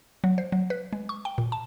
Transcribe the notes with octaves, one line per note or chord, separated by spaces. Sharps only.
F#3
C5
F#3
B4
G#3
C#6
G5
A#2
A5